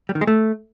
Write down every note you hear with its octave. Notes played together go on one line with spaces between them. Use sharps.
G3
D#3
G#3
A3